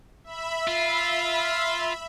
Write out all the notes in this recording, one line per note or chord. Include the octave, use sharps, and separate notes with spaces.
E5 B5
F4